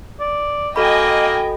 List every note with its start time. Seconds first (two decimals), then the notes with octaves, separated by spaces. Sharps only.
0.20 D5
0.76 A#3 F#4 A4 D#5 G5 G#5 B5